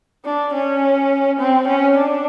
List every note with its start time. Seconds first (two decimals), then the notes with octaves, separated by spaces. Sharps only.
0.25 D4
0.54 C#4
1.40 C4
1.68 C#4
1.97 D4